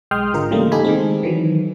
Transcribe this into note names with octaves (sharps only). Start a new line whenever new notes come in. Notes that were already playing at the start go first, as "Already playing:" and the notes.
B1 G#3 G5 C6 D#6 F6
G#1 D3 F4 A#4 D#5
C#3 E3 G3 A3 A#3
D#4 G4 A4 G#5 B5
D#3 G#3 C4
D#3 E3 F#3